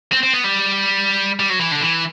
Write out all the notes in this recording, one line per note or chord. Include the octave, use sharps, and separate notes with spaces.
C4
C4
B3
G3
G3
F#3
E3
D3
E3